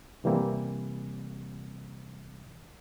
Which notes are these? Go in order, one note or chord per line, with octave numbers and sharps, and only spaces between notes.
C3 E3 G3 A#3 C4